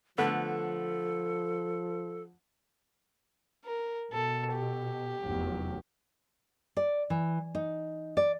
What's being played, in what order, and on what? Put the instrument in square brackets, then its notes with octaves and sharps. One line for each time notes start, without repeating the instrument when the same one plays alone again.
[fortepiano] D3 A3 B3 [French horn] F3 [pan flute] A4
[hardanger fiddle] A#4
[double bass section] B2 [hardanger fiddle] A4
[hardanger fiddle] G4
[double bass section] F1 E2 F#3
[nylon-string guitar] D5
E3
D#4
D5